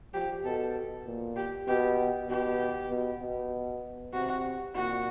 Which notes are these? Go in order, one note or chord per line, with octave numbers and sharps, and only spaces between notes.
F3 G4
B2 A4
A#2
G4
B2 G4
B2 G4
B2
B2
C3 F#4
A#2 F#4